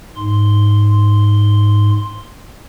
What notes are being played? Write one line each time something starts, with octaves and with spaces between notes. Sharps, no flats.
G#2 C6